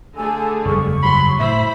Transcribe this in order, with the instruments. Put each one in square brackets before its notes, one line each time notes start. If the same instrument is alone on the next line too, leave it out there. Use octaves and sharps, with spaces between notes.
[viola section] D3 A3 G#4 [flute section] G#5 A5 E6
[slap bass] F#1 E2 G3 [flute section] C#6
[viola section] F#3 C6 [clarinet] B5
[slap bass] A2 [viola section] E4 C5 B5 [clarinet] E5